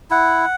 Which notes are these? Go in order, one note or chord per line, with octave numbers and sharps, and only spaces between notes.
E4 F#5